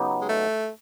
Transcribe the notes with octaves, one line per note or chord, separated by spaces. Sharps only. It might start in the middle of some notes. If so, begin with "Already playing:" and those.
Already playing: C#3 F#3 B3 D#4 G4
G#3
A3